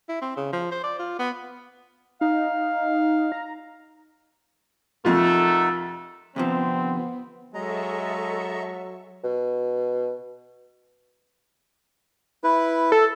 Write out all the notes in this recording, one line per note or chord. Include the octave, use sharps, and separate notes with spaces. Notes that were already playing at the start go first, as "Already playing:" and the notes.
E4
C4
C#3
F3
C5
D5
F4
B3
D#4 F5
A#5
F2 C3 A3 D#4 F4 A#4 F#5
D2 C3 F3 B3 C4
F#3 G#3 A4 D#5 E5 A#5 C#6
B2
E4 B4
A4